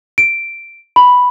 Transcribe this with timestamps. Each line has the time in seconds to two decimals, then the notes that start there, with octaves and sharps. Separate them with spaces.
0.18 D7
0.96 B5